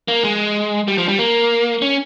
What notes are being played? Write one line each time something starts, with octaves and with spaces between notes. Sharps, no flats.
A#3
G#3
G3
F3
G3
A#3
C#4